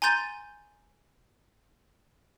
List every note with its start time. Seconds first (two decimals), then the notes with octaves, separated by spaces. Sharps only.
0.02 G#5 A#5 C6 G6 A6 D#7